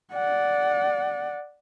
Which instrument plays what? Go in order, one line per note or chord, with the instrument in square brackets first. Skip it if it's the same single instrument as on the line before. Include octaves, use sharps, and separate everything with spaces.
[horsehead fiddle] D5 F#5